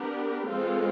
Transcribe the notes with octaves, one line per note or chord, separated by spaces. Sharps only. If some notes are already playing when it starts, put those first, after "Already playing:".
Already playing: B3 D4 G4 A#4
E3 G#3 C4 F4 A4